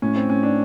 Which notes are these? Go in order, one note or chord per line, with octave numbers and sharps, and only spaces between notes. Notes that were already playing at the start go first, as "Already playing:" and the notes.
A2 C#4
C4
A2 C#4
D4